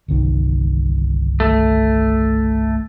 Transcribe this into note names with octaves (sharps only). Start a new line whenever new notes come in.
G1 C2 D#3
A3